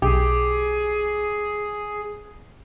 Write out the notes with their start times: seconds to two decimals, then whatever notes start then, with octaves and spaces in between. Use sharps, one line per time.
0.02 B1 G4 G#4